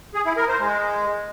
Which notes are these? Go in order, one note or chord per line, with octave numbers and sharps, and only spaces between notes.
G#4
E4
A#4
C5
G#3